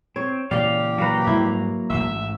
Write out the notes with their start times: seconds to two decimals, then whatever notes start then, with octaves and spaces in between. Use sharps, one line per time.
0.16 C4 C#5
0.51 A#2 C#3 E3 G4 D5 F5
0.98 F#3 A#3 B4 F5 A#5
1.27 G#2 G3 G#3 E4
1.90 A1 G#2 E5